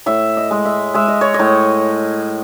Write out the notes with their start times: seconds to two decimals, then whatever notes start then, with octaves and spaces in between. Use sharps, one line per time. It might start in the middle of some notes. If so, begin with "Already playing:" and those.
0.06 A2 E5
0.37 D#5
0.51 G#3
0.65 E5
0.94 G#3 E5
1.08 D#5
1.21 C#5
1.34 D#5
1.39 A2